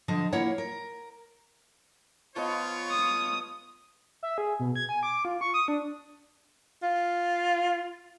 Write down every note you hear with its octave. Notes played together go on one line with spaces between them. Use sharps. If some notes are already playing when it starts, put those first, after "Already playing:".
D3 F3 D#5 A5
A#3 E4 F4 C#5 F#5
A#4
F3 B3 F4 C#5 D#5
D#6
E5
G#4
B2
G#6
G#5
D6
F4
C#6
D#6
D4
F4